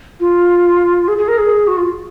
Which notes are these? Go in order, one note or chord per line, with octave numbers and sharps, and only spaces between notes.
F4
G#4
G#4
A#4
G#4
F#4
F4